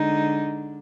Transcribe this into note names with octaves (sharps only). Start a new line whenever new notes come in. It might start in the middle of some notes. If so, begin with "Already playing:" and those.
Already playing: D3 G#3 D#4